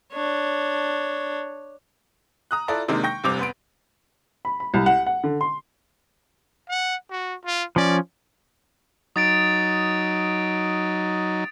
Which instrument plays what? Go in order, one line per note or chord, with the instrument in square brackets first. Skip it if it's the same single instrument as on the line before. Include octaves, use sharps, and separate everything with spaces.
[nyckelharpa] D4 C#5
[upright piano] A#5 D#6 F#6
E4 F4 A4 D5 A5 A#5
C3 D#3 G#3 A#3 D4 D#4
G5 C#6 G6 A#6
F1 G2 C3 C5 D6 F7
B3 C6 D7
B5
B5
C2
F#5
F#5
D3
C6
[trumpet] F#5
F#4
F4
[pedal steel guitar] F3 C#4 [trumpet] D5
[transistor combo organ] F#3 D#4 [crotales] D#6 A6 D7